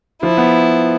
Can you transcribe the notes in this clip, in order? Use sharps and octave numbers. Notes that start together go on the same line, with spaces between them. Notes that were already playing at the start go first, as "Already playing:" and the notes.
F3 E4
B3